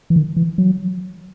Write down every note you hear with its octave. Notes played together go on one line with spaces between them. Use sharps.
E3
D#3
E3
F#3